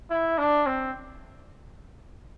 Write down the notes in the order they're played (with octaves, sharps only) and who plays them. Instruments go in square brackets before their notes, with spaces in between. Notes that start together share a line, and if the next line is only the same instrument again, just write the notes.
[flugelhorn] E4
D4
C4